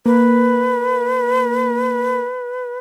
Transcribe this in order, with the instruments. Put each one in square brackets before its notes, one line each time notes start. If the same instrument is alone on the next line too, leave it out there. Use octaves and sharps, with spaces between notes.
[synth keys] A#3 [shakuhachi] B4